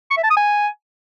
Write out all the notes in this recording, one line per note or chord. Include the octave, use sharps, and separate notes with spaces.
C#6
E5
A5
D#6
G#5